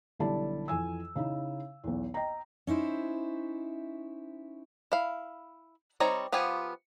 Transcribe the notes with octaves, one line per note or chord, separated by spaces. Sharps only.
B1 D3 G3 E4 D5 A5
F2 E3 G#5 E6
C#3 D#4 E4
B1 E2
D#5 G5 A#5
C#4 D#4 E4 C5
E4 F5
G3 C4 D#4 C#5 A#5
F3 B3 F4 G4 G#5